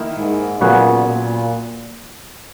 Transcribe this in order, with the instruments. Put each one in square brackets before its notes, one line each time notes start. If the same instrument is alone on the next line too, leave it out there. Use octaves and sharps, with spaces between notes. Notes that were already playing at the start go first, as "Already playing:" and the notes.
Already playing: [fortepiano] D#3 A#3 E4
[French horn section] G#2
[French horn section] A#2 [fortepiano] C#3 F#3 B3 F#4
[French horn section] A#2